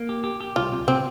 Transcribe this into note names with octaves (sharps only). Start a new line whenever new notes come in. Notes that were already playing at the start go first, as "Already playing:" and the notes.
Already playing: A#3
G4
G4
G4
C2 F4
C3
C3 C4